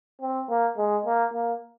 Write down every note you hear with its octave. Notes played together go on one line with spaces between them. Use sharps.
C4
A#3
G#3
A#3
A#3